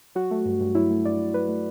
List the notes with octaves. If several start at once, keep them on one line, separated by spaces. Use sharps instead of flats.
F#3 F#4
A3
G2
G2
F#3 E4
A3
G2 D5
G2
F#3 B4
A3